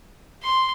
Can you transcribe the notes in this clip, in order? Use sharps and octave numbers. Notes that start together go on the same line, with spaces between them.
C6